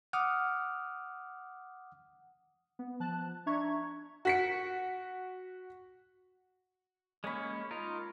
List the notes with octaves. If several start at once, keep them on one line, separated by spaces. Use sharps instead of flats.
F#5 D6 D#6 F6
B3
F3 A5 F#6
D4 E5 A#5 C#6 G#6
F#4 B6 C#7
G#3 A#3 C#4 C#5 B5
D#4 F4 A#4